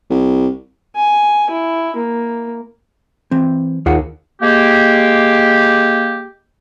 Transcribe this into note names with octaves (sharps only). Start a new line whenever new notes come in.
C2
G#5
E4
A#3
E3 C4
D#2 F4 G#4 F#5
G#3 A#3 G4